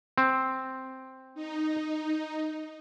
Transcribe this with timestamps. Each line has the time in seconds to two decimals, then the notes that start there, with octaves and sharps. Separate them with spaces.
0.18 C4
1.34 D#4